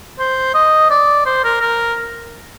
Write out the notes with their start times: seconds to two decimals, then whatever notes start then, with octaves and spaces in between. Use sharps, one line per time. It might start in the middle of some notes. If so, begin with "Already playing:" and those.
0.19 C5
0.55 D#5
0.90 D5
1.26 C5
1.44 A#4
1.62 A#4